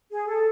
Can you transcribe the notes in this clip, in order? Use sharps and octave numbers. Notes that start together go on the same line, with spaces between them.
G#4
A4